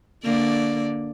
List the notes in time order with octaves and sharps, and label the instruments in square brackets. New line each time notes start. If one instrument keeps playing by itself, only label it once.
[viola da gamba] D3 A#3 D5